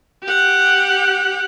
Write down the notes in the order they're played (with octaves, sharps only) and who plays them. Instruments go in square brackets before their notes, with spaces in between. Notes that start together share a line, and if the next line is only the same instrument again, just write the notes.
[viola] G4 F#5